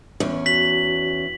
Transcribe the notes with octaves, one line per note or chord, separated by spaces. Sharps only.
E2 C#4
F#4 B6 F#7